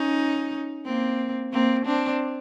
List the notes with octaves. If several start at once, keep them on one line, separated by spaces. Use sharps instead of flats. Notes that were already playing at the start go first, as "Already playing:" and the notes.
Already playing: C#4 D#4
A#3 C4
A#3 C4
C4 D4